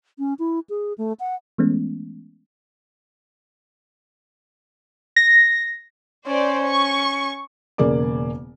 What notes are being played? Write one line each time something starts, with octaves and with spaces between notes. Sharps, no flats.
C#4
E4
G#4
A3
F#5
E3 G#3 A3 B3 C#4
A#6
C#4 C5 D5
C#6
E1 C#3 A#3 G#4 D5 D6